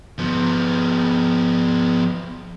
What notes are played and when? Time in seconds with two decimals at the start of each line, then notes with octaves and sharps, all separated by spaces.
0.18 F3 B3